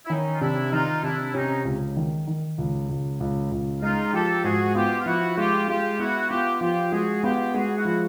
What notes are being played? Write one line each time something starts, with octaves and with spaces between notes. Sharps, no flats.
E4
D#3 C#4 D#4
F4
C3 D4 E4
D#3 D#4 F4
C3 D4 E4
C3 C#4 D#4
C#2
D#3
D#3
C#2
C#2
C#2
C#2
G#3 D#4 F4
F3 G4 A4
G#2 F#4 G#4
B3 F4 G4
F4
F3 E4 F#4
G#3 F4 G4
G#3 F4 G4
B3 E4 F#4
B3 F4 G4
F3 F4 G4
G#3 F#4 G#4
B3 F4 G4
G#3 F#4 G#4
E4 F#4
F3